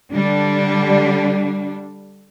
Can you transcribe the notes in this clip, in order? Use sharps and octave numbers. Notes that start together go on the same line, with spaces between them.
D3 G3 D4